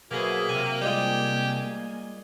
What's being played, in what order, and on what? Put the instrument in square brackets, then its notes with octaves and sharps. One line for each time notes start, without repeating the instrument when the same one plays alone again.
[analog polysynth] B2 G#4 [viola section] F#3 C5 E5 [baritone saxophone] A#3
[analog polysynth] C3 [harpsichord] G#5
[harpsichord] G3 G#3 F4 [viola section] A#3 G#5 [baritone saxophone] G4